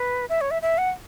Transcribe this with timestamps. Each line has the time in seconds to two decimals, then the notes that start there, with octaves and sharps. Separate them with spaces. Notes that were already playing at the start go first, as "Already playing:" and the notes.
Already playing: B4
0.29 E5
0.41 C#5
0.51 E5
0.62 E5
0.78 F#5